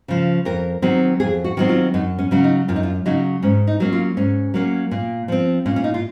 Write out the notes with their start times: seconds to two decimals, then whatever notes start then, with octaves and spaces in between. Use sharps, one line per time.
0.08 C#3 F3
0.45 F2 A#4
0.82 D#3 F#3 C4
1.20 F2 G#4
1.44 F#4
1.57 D#3 F#3 C4
1.69 F4
1.94 F#2 D#4
2.19 C#4
2.31 C#3 F#3 C#4
2.44 D#4
2.68 F#2 F4
2.76 D#4
2.83 F4
3.06 C#3 F#3 C#4 D#4
3.43 G#2 C#4
3.67 D#4
3.80 F#3 A#3 C#4
3.93 F4
4.17 G#2 C#4
4.54 F#3 A#3 C#4
4.91 A#2
5.28 F3 C4
5.66 A#2 C#4
5.76 C#4
5.84 D#4
5.94 F4